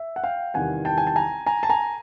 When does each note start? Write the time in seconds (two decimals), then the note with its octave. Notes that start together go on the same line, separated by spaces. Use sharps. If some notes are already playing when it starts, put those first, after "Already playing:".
Already playing: E5
0.16 F#5
0.24 F5 G5
0.54 E2 C3 D#3 G3 F#5 G#5
0.85 G5 A5
0.98 G#5
1.07 A5
1.16 G#5 A#5
1.46 G#5 A#5
1.63 A5
1.70 G#5 A#5